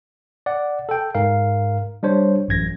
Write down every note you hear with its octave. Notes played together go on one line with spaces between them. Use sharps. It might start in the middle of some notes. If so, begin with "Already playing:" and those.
D5 F#5
A4 G5
G#2 A#4 F5
G3 D4 C5 C#5
A1 F#2 G#6 A#6